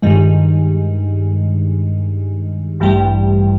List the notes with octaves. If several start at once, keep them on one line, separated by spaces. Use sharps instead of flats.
G2 D#3 G#3
A1 G2 E3 G3